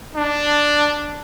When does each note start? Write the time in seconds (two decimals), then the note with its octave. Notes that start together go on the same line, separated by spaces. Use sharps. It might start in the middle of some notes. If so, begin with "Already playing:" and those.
0.15 D4